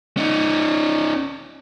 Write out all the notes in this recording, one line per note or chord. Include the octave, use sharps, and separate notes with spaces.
C#4 D#4